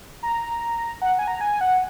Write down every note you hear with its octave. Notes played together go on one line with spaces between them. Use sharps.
A#5
F#5
G#5
A#5
G#5
F#5